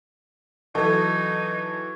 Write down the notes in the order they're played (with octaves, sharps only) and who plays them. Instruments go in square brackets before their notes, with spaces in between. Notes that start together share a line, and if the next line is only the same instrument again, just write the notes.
[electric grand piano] E3 F#3 [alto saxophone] D#4 [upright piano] A4 [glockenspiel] C#6 G#6